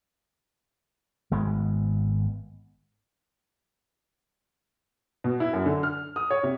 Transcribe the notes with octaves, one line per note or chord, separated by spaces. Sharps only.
G#1 G#3 B3
B2
E4
F#2
D3
F6
D#6
C#5
C3